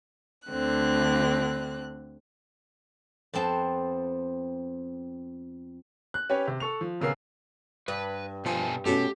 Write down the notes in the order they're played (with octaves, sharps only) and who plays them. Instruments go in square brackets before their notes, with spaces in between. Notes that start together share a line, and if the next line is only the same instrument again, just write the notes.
[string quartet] D2 D3 C4 F#6
[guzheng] F2 B3 C4 A5
[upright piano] F#6
C#4 G4 B4 C#5
C3
A4 C#6 F7
F3
D#1 C#3 B3 A#4 E6 C7
[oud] G2 [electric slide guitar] B4
[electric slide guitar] B2 A4 G#5 [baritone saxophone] F3
[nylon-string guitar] B2 C#4 F#4 [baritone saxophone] A3 [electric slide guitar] G4